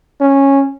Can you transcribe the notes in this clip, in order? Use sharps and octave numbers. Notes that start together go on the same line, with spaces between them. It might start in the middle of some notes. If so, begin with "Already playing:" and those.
C#4